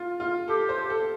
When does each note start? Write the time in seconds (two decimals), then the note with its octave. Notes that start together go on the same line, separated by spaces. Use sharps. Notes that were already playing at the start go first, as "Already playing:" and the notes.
Already playing: F4
0.20 F4
0.48 G4 A4
0.69 C5
0.90 A4